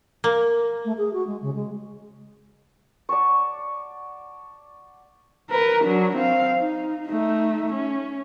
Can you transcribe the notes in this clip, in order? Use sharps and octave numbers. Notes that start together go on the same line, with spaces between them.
A#3
A3
G#4
F#4
G#3
C#3
G#3
D5 F#5 A5 C#6
A#4 B4
F#3 D4
C4 F5
D#4
A3 D#4
C#4